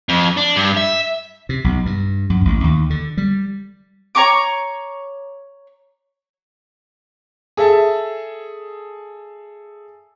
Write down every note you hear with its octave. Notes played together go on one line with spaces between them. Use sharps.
F2
D4
G2
E5
C3
B1
G2
F#2
A1
D#2
D3
G3
C#5 A#5 C#6 D6
G#4 A4 E5 A5